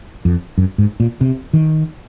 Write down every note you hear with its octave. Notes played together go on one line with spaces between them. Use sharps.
F2
F#2
G#2
A#2
C3
D#3